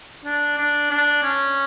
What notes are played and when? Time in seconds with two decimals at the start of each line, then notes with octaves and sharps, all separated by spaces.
0.26 D4
0.58 D4
0.90 D4
1.23 C#4